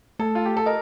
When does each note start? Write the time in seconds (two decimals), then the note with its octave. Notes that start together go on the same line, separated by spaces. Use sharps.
0.19 A3 A4
0.35 F4
0.46 G4
0.57 A4
0.66 A#4 D#5